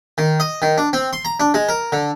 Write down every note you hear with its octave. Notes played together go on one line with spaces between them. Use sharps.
D#3
D#5
D#3
D4
C4
C6
A#5
D4
G#3
A#4
D3